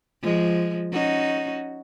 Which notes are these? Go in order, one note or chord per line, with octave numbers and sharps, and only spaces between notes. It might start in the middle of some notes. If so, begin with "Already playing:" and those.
F3 G#3
C#4 D#4 F#4